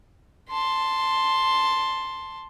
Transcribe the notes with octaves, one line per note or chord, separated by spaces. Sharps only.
A5 C6